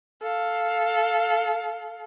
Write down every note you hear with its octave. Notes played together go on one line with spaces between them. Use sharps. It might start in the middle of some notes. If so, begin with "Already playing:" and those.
A4 F5